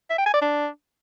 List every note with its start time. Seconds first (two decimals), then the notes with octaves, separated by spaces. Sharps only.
0.10 E5
0.18 G5
0.26 G#5
0.34 D5
0.41 D4